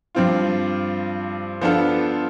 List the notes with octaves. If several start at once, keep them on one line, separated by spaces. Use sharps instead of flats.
G2 F3 C4 F4
F3 B3 D4 F4 A4